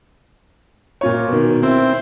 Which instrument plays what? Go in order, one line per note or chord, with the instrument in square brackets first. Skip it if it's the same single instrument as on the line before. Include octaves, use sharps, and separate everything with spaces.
[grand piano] A#2 F4 C#5
B2 D#3
[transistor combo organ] C4 [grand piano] E4